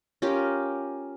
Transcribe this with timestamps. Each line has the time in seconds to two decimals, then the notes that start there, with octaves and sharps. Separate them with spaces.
0.22 C#4 F4 G4 A#4